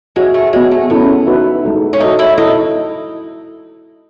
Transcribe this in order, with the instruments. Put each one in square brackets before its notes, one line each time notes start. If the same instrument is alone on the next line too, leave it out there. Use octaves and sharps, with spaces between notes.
[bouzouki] G#3 [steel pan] F#4 C#5 E5
[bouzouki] A3
[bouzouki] G#3 [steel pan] B3 F#4 C#5
[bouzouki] A3
[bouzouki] B3 [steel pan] C#4 E4 A4
[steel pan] D#4 F#4 B4 E5
G#3 D#4 A4 E5
[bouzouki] C#4
[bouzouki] D#4 [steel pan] F#4 A4 E5
[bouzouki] E4
[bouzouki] D#4 [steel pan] E4 A4 E5